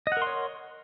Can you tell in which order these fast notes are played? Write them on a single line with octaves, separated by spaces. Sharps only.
D#5 F#5 A#4 C6 C#5